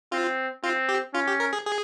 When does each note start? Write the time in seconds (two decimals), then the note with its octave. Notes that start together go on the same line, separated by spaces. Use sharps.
0.12 C4 F4
0.64 C4 F4
0.89 G4
1.14 C#4 F4
1.27 G4
1.40 A#4
1.53 G#4
1.66 G#4